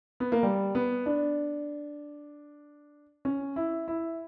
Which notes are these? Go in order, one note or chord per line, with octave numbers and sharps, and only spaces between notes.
B3
A#3
G3
B3
D4
C#4
E4
E4